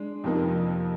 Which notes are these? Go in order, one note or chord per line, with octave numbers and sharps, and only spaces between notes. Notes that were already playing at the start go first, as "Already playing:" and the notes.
Already playing: G#3 D4
F2 C3 F3 A#3 D#4